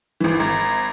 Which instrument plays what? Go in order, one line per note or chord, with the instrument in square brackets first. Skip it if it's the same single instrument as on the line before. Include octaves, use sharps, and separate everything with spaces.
[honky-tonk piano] G#1 E3
[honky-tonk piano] G#1 [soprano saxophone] A#5